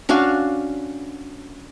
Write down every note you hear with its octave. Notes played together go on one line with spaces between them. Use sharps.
C#4 D4 F#4 F5